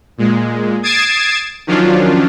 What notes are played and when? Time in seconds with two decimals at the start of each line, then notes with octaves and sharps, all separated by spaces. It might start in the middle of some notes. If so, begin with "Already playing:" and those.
0.18 A#2 G#3
0.83 D#6 G#6 A6 C7 D7 E7
1.67 D#3 F3 F#3 C#4 D4 F4